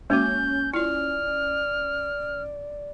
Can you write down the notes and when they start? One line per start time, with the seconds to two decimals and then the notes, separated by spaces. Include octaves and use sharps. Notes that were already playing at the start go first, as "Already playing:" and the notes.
0.10 G#3 A#3 C#4 F#4 G6
0.74 E4 F4 D5 F6